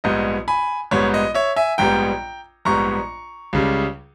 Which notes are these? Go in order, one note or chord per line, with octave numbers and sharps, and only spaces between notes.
A#1 G#2 G3 B3 D#5
G#5 B5
A#1 G#2 G3 B3 C#5
D#5
C#5 E5
E5 G#5
A#1 G#2 G3 B3 G5 A#5
A#1 G#2 G3 B3 A#5 C#6
C#2 C#3 G3